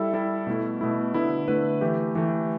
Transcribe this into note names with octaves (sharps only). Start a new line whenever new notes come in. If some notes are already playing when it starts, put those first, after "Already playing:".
Already playing: G3 E4 A4 E5
G3 E4 A4 E5
B2 A3 E4
B2 A3 E4
D3 A3 E4 B4
D3 A3 E4 B4
E3 A3 G4
E3 A3 G4